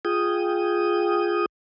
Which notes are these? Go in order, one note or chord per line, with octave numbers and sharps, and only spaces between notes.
F4 G#4 G5 D#6